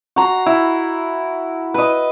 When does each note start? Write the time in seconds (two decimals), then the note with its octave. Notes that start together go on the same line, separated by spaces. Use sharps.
0.16 F#4 A#5 C6
0.46 E4
1.74 B4 D#5